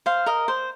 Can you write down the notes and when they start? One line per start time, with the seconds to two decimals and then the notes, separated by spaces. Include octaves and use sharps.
0.06 C5 F5
0.26 A#4 D#5
0.48 C5